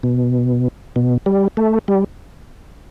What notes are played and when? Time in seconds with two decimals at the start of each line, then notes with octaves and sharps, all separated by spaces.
0.03 B2
0.96 B2
1.26 G3
1.57 A3
1.88 G3